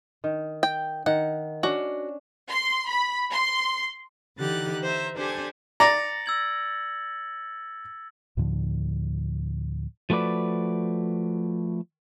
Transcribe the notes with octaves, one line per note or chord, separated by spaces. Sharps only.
D#3
G5
D#3 F#5
C#4 D4 F#4
C6
B5
C6
D3 E3 D#4 G4 F#6 A6
C5 E5 A#5
D4 G4 A4 C5 G#5
D5 A#5 A6 A#6 C#7
E6 G#6 F#7
D2 A2 D3 F3
F3 A3 F#4 B4 D5